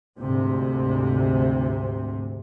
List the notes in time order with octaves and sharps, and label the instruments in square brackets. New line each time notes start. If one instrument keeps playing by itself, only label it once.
[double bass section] D2 G#2 C3